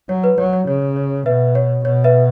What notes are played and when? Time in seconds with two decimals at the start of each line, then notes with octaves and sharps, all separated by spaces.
0.09 F#3 C#5
0.24 B4
0.38 F#3 C#5
0.53 C#5
0.67 C#3 C#5
0.96 C#5
1.26 B2 B4 E5
1.55 C#5
1.85 B2 C#5
2.04 B4 E5